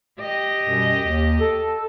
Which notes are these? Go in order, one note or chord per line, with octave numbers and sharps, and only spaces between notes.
G4 D#5
F#2 B2 G3
D#2
A4